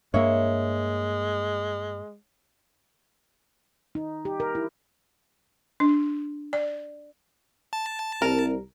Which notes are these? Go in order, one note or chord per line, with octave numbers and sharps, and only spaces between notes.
G2 G#3 A#3 C#5 E5
D#4
G4
A#4
E4
D4
D5
A5
C2 C4 A#4